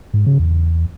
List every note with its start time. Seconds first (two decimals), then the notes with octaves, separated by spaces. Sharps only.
0.14 G#2
0.26 C#3
0.39 E2